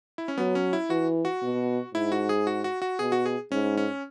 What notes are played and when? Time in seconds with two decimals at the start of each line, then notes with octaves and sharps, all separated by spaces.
0.18 E4
0.28 C#4
0.38 F#3 B3
0.55 C#4
0.73 E4
0.90 E3 F#4
1.25 F#4
1.43 B2
1.94 G#2 E4
2.12 F#4
2.29 G#4
2.47 F#4
2.64 F#4
2.82 F#4
2.99 B2 G#4
3.12 F#4
3.26 G#4
3.51 G#2 C#4
3.77 C#4